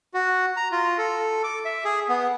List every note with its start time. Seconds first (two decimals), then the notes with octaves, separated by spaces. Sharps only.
0.14 F#4
0.57 A#5
0.72 F4
0.98 A4
1.44 D6
1.65 E5
1.84 G#4
2.09 B3